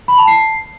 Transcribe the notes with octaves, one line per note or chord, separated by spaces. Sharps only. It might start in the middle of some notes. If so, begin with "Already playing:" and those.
B5
A5
C7